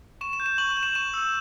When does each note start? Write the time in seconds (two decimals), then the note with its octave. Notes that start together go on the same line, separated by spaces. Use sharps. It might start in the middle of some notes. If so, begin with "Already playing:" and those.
0.21 C#6 E7
0.33 E7
0.40 G6
0.46 E7
0.58 C#6 F#7
0.71 F#7
0.77 G6
0.83 E7
0.95 C#6 E7
1.14 E6 G6